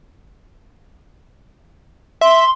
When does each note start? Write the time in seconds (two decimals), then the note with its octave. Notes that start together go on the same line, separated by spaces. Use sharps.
2.21 E5 C6